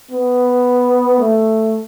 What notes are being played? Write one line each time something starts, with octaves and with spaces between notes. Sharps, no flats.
B3
A3